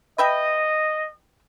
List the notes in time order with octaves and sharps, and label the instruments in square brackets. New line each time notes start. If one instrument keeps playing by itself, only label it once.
[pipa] B4 E5 G5 [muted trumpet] D#5